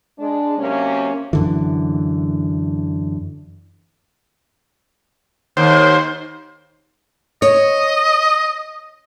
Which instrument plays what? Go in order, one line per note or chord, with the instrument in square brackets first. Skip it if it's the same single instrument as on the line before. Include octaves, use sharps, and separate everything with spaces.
[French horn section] G#3 D4
C3 F#3 A#3 C#4
[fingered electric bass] F#2 D3 E3
[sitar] D#2 [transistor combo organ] C5
[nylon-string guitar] C#5 [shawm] D#5